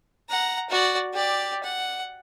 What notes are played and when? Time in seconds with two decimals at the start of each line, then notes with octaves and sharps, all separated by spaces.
0.29 F#5 A#5
0.69 F#4 D5
1.13 G4 D5
1.63 F#5